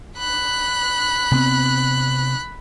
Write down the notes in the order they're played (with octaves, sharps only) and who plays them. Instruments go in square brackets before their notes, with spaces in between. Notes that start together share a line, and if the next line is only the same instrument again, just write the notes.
[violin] B5 F#6
[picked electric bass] C3 B3 C4